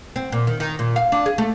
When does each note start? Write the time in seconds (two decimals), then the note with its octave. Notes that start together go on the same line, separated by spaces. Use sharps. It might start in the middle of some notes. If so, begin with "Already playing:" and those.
0.16 C4
0.32 A#2
0.47 D#3
0.60 D#3
0.79 A#2
0.96 F5
1.12 D4
1.26 G#4
1.38 A3